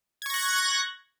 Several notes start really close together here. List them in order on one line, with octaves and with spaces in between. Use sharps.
G#6 C#6 A#6 F#6